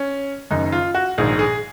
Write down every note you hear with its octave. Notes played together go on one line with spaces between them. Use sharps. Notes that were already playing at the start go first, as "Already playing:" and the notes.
Already playing: C#4
F#1 F#2 D#3 D#4
F4
F#4
A#1 G#2 D#3 G#4
G#4